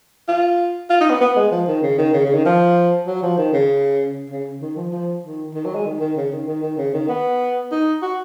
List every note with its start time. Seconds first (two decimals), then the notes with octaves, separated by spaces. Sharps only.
0.28 F4
0.90 F4
1.01 D#4
1.10 B3
1.21 B3
1.36 G#3
1.51 F3
1.68 D#3
1.83 C#3
1.98 D#3
2.13 C#3
2.25 C#3
2.35 D#3
2.45 F3
3.07 F#3
3.22 F3
3.37 D#3
3.53 C#3
4.30 C#3
4.62 D#3
4.76 F3
4.92 F3
5.23 D#3
5.55 D#3
5.65 F#3
5.75 G#3
5.86 D#3
6.00 D#3
6.17 C#3
6.32 D#3
6.48 D#3
6.63 D#3
6.78 C#3
6.94 D#3
7.09 B3
7.71 D#4
8.02 F#4